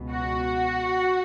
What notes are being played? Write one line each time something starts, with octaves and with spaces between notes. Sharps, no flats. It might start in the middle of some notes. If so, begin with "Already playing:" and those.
Already playing: C#2 B2
F#4